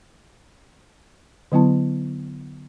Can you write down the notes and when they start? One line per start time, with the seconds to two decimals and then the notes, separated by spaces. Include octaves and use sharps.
1.52 D3 F#3 B3 E4 A5